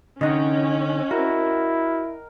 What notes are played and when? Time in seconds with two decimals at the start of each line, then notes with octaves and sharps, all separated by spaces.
0.21 D3 C#4 D#4 D#5 F#5 G5
1.11 E4 F#4 A#4